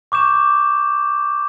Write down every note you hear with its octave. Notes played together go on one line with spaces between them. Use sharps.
C#6 D6 G6 E7